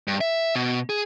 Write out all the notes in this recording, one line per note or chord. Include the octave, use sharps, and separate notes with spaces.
G2
E5
B2
G#4